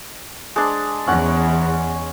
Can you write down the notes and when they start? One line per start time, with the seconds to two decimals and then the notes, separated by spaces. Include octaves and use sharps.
0.56 G#3 D4
1.07 E2 C#4 F#5